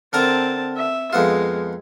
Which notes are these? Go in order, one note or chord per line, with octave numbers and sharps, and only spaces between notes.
D3 C4 A#4 A5 A#5
E5
F2 G#3 B3 F4